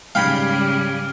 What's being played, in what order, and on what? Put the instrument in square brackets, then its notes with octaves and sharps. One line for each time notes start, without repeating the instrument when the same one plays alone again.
[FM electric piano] G#2 [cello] C#3 G3 [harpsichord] F5 G5 B5 [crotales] F6 G#6